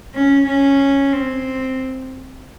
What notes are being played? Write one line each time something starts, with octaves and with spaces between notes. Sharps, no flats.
C#4
C#4
C4